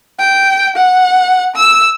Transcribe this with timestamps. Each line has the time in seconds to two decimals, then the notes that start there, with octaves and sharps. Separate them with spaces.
0.19 G5
0.76 F#5
1.56 E6